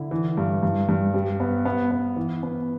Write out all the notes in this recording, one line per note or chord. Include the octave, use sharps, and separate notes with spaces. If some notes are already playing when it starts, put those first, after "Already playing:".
Already playing: D3 E4
E3
G2
G2
G2
G3
B3
B3
B3
E3
B3